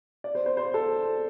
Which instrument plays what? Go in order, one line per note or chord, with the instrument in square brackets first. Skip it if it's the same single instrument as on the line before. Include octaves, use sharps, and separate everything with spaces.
[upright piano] D5
C5
C5
C5
A4